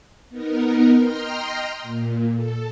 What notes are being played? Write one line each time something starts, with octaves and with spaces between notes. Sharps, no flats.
B3 D#4 A#4
D#5 G5 A#5 C6 F6
A#2
A4